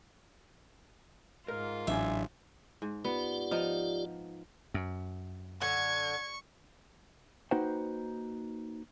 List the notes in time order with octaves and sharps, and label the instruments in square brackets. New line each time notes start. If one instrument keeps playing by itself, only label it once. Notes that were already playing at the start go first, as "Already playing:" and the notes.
[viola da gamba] G#2 F4 [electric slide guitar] A#4
[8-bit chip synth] A1 [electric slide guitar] F#3 D4 G#5 [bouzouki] E5
[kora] G#2
[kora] B3 [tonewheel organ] F4 G4 D5
[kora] F3 D#4
[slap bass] F#2
[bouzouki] D3 [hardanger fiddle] C#6 [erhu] G#6
[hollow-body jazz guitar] A#3 D#4 F#4 B4 C5 G5